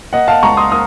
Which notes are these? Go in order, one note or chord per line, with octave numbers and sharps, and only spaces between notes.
A#3 D#5 F#5
F5 A5
C#2 A#5 C#6
C6 D#6
A#3 D#6